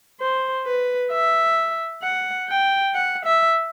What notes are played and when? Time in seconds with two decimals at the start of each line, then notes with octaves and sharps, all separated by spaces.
0.20 C5
0.66 B4
1.12 E5
2.03 F#5
2.48 G5
2.95 F#5
3.25 E5